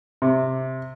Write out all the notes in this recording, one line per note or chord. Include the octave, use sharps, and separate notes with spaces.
C3